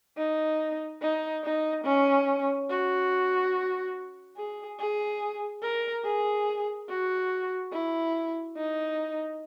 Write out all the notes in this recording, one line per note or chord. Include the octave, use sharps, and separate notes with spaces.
D#4
D#4
D#4
C#4
F#4
G#4
G#4
A#4
G#4
F#4
E4
D#4